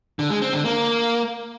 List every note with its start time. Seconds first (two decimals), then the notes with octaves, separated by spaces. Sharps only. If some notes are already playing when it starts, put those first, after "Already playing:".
0.19 D3
0.30 G#3
0.42 C4
0.53 D3
0.64 A#3